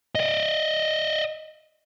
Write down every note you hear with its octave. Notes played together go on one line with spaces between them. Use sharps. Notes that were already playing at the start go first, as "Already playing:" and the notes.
D5 D#5